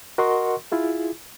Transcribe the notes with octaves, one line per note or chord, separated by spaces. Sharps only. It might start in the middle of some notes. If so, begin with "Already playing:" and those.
F#4 A#4 D#5 F#5 C6 C#6
E4 F4 G#4